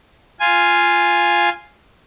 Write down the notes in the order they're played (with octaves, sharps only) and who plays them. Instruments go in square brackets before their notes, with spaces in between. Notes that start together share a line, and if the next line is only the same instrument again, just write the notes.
[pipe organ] F4 G#5